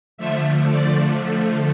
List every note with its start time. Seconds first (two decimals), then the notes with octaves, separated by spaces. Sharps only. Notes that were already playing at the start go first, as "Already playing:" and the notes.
0.18 D3 F3 A3 E5
0.71 D5